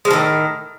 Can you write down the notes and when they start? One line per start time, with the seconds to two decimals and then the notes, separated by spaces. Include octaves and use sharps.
0.05 G#3
0.08 F3
0.10 D#3
0.13 A2